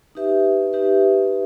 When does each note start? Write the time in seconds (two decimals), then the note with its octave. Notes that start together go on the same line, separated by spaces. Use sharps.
0.15 D#4 G4 B4 E5
0.73 D#4 G4 B4 E5